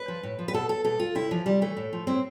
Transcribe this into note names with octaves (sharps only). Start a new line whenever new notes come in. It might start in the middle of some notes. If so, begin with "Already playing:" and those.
Already playing: B4
F3
A2
F3
B4
B2 A4
A4
B2 A4
F4
C3 E4
E3 F3
C3 G3
E3 A3
A2
F3
A2 C4